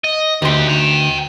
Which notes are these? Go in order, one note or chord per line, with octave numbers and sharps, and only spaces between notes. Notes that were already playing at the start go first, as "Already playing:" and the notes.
D#5
D2 D#3 G4 C6
G5 A#5